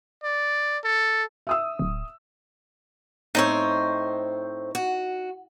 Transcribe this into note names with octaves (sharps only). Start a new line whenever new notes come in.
D5
A4
E5 D#6 E6
D1
A2 C4 D#4 C5 C#5
F#4